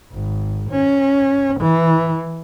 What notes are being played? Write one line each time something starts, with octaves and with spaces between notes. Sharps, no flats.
G#1
C#4
E3